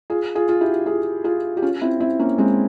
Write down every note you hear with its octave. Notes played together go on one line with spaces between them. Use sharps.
F4 G#4
F4 G#4
F4
E4 G4
F4 G#4
F4 G#4
G4
C#4 F4
C4 E4
C4 E4
A#3 C#4
G#3 C4